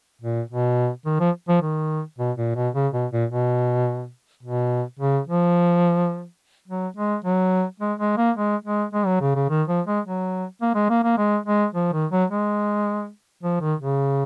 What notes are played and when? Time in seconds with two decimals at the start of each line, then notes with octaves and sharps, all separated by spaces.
0.22 A#2
0.50 B2
1.06 D#3
1.20 F3
1.48 F3
1.62 D#3
2.18 B2
2.37 A#2
2.56 B2
2.74 C#3
2.93 B2
3.12 A#2
3.30 B2
4.43 B2
4.99 C#3
5.27 F3
6.68 F#3
6.97 G#3
7.24 F#3
7.80 G#3
8.00 G#3
8.17 A#3
8.37 G#3
8.65 G#3
8.93 G#3
9.06 F#3
9.21 C#3
9.35 C#3
9.49 D#3
9.68 F3
9.87 G#3
10.05 F#3
10.62 A#3
10.75 G#3
10.90 A#3
11.04 A#3
11.18 G#3
11.46 G#3
11.75 F3
11.93 D#3
12.11 F#3
12.30 G#3
13.43 F3
13.61 D#3
13.80 C#3